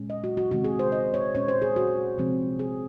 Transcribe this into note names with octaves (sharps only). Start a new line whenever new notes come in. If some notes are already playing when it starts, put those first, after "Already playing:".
Already playing: A#2 G#3 C#4
D#5
F#4
F#4
C3 D#3 G#3 C4 F#4
G#4
C5
D#5
C#5
A#2 G#3 C#4 C#5
C5
G#4
F#4
C3 F3 G#3 C4
G#4